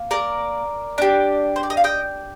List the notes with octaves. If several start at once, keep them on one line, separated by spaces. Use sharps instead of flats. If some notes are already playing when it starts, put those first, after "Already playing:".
Already playing: A#3
A#4 D5
D4 G4
C5
D5
D#5
F5
D#5 G5